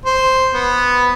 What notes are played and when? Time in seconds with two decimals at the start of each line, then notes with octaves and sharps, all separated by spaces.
0.05 C5
0.54 B3